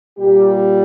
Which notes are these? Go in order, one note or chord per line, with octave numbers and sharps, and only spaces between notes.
A#2 G3 G4